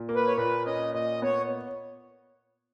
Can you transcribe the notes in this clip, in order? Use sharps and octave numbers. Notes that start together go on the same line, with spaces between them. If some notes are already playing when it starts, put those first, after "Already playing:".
Already playing: A#2
A#3
B4
C#5
A#2 B4
C#4 D#5
A#2 D#5
B3 C#5